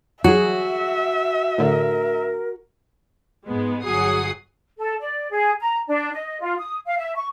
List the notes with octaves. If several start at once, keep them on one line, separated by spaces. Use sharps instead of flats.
F#3 F#4 G#4 E5
A2 D3 A#4
G#2 G#3 B3
G1 F#3 G#4 F#5 D#6 C7
A4
D5
G#4
A#5
D4
D#5
F4
D#6
F5
E5
C#6